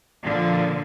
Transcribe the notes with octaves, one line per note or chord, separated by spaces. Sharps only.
A#2 D3 F3